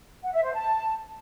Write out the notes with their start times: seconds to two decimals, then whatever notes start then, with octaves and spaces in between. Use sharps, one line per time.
0.22 F#5
0.33 E5
0.43 C5
0.53 A5